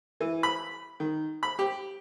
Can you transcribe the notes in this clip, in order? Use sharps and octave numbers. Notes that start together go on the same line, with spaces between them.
E3
B5
D#3
B5
G4